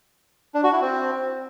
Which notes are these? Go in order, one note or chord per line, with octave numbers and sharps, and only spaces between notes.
D4
F#4
E4
C4